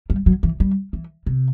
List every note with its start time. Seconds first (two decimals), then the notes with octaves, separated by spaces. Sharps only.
0.10 G3
0.26 F#3
0.43 E3
0.60 G3
0.93 E3
1.26 C3